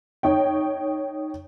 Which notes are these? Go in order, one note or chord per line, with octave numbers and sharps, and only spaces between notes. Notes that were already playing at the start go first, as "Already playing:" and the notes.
D#4 C#5 G5